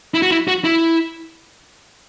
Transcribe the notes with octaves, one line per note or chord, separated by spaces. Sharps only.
E4
F#4
E4
F#4
E4